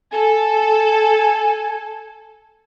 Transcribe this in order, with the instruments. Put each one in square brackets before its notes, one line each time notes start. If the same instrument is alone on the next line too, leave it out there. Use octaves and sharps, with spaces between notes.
[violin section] A4 [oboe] G#5